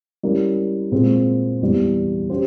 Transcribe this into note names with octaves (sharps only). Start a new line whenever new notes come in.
G3 C#4 E4 A#4
A#2 G#3 C4
E2 E3 G3
C#4 G4 C5